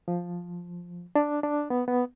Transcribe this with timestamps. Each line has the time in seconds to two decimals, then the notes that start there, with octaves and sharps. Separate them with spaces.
0.08 F3
1.16 D4
1.43 D4
1.70 B3
1.88 B3